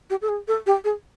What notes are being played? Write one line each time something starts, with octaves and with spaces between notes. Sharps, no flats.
G4
A4
G#4
A4
G4
G#4